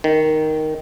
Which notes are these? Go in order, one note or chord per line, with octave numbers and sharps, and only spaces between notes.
D#3